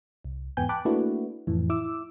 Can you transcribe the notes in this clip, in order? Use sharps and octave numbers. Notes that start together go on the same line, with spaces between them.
C2
E2 G#2 B3 G5 G#5 G6
G5 A5 B5 D6 F#6
A3 A#3 D4 E4 F#4 B4
F2 A2 E3
E4 D6 E6